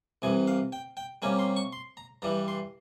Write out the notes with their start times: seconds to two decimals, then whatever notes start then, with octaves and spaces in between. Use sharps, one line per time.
0.22 C2 C3 E3 G#5
0.47 F5
0.72 G5
0.97 G5
1.22 C3 G3 A#3 C#4 G#5
1.39 C6
1.56 C#6
1.73 C6
1.97 A#5
2.22 G2 E3 G3 A#5
2.48 C6